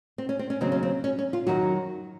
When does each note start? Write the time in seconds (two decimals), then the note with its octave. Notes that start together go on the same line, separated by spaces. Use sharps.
0.18 C4
0.29 C#4
0.39 C4
0.50 C#4
0.61 D#2 C#3 F#3 C4
0.72 C#4
0.83 C4
1.04 C#4
1.19 C#4
1.33 F4
1.46 F#2 D#3 F#3 F#4